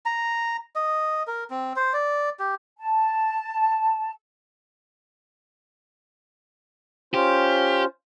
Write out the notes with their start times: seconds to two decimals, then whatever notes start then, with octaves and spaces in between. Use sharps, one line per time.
0.06 A#5
0.76 D#5
1.27 A#4
1.50 C4
1.76 C5
1.93 D5
2.39 G4
2.78 A5
7.14 C#4 F4 G4 C5